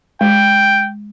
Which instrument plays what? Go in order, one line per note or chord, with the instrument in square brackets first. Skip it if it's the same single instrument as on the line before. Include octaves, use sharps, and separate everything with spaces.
[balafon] G#3 [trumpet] G5